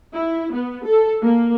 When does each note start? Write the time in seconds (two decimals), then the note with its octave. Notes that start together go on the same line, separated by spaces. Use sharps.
0.14 E4
0.53 B3
0.86 A4
1.23 A#3